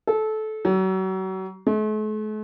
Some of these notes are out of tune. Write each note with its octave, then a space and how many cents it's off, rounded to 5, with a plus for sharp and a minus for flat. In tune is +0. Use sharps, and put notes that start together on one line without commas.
A4 -20
F#3 +35
A3 -45